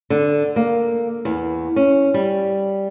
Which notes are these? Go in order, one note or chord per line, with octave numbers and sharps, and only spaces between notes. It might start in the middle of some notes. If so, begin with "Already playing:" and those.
D3
A#3
E2
C#4
G3